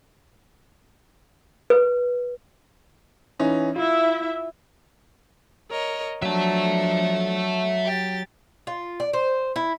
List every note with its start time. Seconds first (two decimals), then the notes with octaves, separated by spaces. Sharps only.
1.70 B4
3.39 E3 C#4 D#4
3.76 E4 F4 E5
5.69 A#4 C#5 D#5
6.22 F3 F#3 D4 E5 A5
7.85 G4 A6
8.67 F4
9.00 D5
9.13 C5
9.56 E4